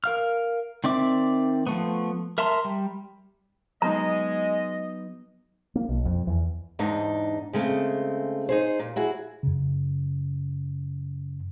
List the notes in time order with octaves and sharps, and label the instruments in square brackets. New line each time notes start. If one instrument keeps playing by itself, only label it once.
[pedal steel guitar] A#4 F5 F6
D#3 C4 D5 E5 D6
F3 A3 B3
A#4 E5 A5 A#5 C6
G3
[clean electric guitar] F#3 B3 D#4 [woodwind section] G#3 [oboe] D#5 [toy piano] A#5
[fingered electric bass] A#3
B1
F2
E2
[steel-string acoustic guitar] E2 G#2 D4 D#4
C#3 G#3 A3 C4
D#4 G#4 C5
A#2
E4 F#4 G#4
[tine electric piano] F#2 C#3